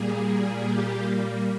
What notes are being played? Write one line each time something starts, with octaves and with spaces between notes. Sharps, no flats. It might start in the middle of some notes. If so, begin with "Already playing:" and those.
Already playing: A#2 G3 A#3 G#4
G#4
G4